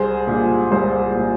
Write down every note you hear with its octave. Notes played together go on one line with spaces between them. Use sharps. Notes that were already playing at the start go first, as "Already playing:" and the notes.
Already playing: C2 G#4 C5
A#2 G#3
C2 G#4 C5
A#2 G#3